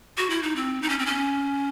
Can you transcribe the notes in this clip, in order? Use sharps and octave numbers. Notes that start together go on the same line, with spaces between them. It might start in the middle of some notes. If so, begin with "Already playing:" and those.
F#4
E4
D#4
C4
D#4
C#4
C4
C#4